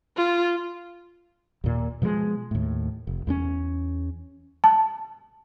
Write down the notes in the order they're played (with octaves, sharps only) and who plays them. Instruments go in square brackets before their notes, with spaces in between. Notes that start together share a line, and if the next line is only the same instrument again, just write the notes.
[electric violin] F4
[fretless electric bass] D#2 A#2
B2 F3 F#3 G#3
D#2 A2
F1
E2 G3 C#4
[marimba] A5